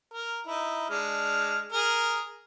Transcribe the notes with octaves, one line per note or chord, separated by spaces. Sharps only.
A#4
D#4 E4
G#3 D4 F6
G#4 A#4